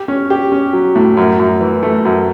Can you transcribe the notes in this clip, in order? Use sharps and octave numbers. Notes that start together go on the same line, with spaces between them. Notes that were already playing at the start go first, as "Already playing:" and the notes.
Already playing: G4
C#4
G4
C#4
F#3
A2
F#2
F#2
E3
A3
F#2